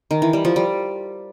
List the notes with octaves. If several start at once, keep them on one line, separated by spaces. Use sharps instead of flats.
D#3
E3
G3
F3
G3